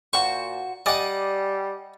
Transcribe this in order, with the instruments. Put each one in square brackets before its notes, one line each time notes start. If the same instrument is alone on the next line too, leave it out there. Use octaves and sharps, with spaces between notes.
[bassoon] A#2 [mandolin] F#4 C5 [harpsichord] C#6
[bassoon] G3 [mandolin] D5 G#5 D6 [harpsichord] D#5 F#5